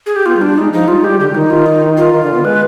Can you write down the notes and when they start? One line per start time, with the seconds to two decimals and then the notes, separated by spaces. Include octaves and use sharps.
0.06 G#4
0.16 G4
0.26 B3 F4
0.37 G3
0.42 D4
0.47 G3
0.57 G#3 D#4
0.73 F3 D#4
0.88 G3 F4
0.99 G#3
1.04 G4
1.09 G3
1.20 D3 G4
1.31 D3
1.35 D#3 D#4
1.50 F4
1.66 D#4
1.97 F4
2.13 D#3
2.23 D3
2.34 B3
2.44 G#3 B4